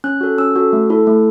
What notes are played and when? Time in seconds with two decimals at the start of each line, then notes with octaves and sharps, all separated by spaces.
0.04 C#4 F#6
0.21 F#4 A4
0.38 C#4 E6
0.56 F#4 A4
0.73 A3
0.90 E4 A4
1.07 A3